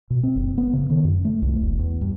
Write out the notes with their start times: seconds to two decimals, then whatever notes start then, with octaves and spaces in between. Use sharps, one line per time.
0.10 B2
0.23 C4
0.36 F#1
0.58 B3
0.73 C#3
0.90 D#3
1.04 F#2
1.25 A3
1.42 C2
1.62 E1
1.79 E2
2.01 G2